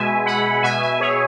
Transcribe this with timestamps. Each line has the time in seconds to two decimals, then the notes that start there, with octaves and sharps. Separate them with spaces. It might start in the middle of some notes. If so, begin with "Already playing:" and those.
Already playing: B2 G#3 E5 G#5
0.26 B2 F#5 B5
0.63 B2 E5 G#5
0.81 E5 G#5
1.00 B2 G#4 C#5